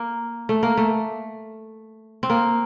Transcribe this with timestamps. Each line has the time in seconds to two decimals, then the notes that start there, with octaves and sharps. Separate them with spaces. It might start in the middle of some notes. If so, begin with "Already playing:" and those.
Already playing: A#3
0.49 A3
0.63 A#3
0.77 A3
2.23 C4
2.30 A#3